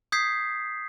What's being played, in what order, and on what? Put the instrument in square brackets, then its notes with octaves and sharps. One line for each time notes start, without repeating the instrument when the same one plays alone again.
[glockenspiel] D#6 G6 G#6 B6 C7